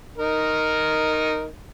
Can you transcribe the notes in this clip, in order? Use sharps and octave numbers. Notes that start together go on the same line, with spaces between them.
D#4 A#4